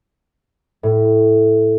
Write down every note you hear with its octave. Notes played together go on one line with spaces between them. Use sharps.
A2